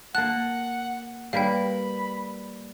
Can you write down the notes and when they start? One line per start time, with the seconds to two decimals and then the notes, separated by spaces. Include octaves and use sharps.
0.15 A#3 F#5 A5 F#6
1.33 G3 A#3 B4 F5 G5 B5